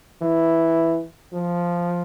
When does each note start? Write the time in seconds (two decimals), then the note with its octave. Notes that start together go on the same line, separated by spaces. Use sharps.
0.22 E3
1.33 F3